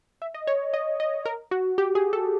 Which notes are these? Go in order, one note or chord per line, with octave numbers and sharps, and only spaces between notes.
E5
D#5
C#5
D#5
D#5
A#4
F#4
G4
G#4
A4